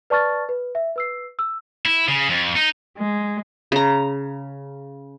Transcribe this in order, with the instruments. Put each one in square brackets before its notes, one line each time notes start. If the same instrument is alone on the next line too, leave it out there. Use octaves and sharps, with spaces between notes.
[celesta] B4 D5 A5 C#6 F6 A6
B4
E5
B4 E6 C7
E6
[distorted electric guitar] E4
C#3
F2
D#4
[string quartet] G#3
[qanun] C#3 A#5